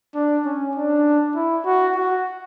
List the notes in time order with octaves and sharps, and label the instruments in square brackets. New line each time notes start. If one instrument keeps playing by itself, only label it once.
[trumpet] D4
C#4
D4
E4
F#4
F#4